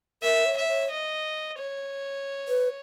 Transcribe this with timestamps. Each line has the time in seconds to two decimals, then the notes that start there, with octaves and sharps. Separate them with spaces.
0.23 A#4 E5
0.46 C#5
0.57 E5
0.68 C#5
0.90 D#5
1.58 C#5
2.48 B4